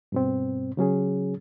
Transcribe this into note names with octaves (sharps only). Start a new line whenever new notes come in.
G2 B2 C4
C#3 F#3 C#4 G#4